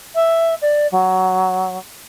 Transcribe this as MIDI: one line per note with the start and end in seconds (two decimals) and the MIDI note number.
0.15 0.54 76
0.61 0.87 74
0.91 1.77 54